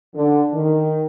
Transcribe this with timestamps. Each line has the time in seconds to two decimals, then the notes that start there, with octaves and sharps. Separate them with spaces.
0.14 D3
0.52 D#3